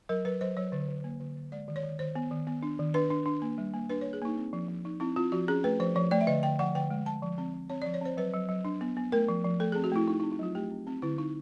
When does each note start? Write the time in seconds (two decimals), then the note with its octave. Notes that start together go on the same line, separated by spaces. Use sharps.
0.09 F#3 A#4
0.25 F#3 B4
0.41 F#3 C5
0.57 F#3 C#5
0.72 D3
0.89 D3
1.04 A#3
1.20 D3
1.36 D3
1.52 G#3 D5
1.68 D#3
1.76 C#5
1.83 D#3
1.99 D#3 C5
2.15 B3
2.31 D#3
2.47 B3
2.63 D4
2.79 D#3
2.94 D4 B4
3.10 D4
3.26 D4
3.42 A#3
3.58 G3
3.74 A#3
3.90 D4 B4
4.01 A#3 C#5
4.13 G#4
4.22 A#3 D#4
4.37 C4
4.53 F3
4.68 F3
4.85 F3 D#4
5.00 C4 E4
5.16 C4 F4
5.32 F3 F#4
5.48 C#4 G#4
5.64 A3 B4
5.80 F3 C5
5.96 F3 C#5
6.11 A3 D5
6.21 E5
6.27 D3 D#5
6.43 D3 G5
6.59 F3 F#5
6.75 D3 G5
6.90 G#3
7.06 G#3 A5
7.22 F3
7.38 C4
7.54 F3
7.70 C4 C#5
7.82 F3 D5
7.94 C#5
8.01 C4 C5
8.17 F#3 B4
8.33 F#3
8.49 F#3
8.65 D4
8.81 B3
8.97 B3
9.12 A3 A#4
9.28 F3
9.44 F3
9.60 A3 A4
9.72 C4 G#4
9.84 F#4
9.92 A3 E4
10.08 A3 D#4
10.20 D#4
10.24 C4
10.32 D#4
10.39 F#3 F4
10.55 A3 G4
10.71 C4
10.87 C4
11.02 D3 E4
11.18 D3 D#4